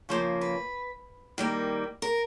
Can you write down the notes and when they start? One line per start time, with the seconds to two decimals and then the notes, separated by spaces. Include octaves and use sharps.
0.09 C#3 F3 A#3 C5
0.41 B4
1.38 D#3 G3 A#3
2.02 A#4